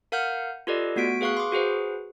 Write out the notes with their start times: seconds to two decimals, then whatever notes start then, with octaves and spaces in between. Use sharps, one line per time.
0.12 A#4 F5 F#5 F6 G6
0.67 F4 G4 A4 B4 D5 D#5
0.96 A3 B3 F#4 B6 D7
1.21 G#4 B4 F5 C#6 F#6
1.37 C6 D6
1.52 F#4 G#4 B4 C5